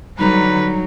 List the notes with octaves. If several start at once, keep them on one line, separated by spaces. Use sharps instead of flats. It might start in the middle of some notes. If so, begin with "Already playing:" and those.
D3 F#3 G3 D#4 B4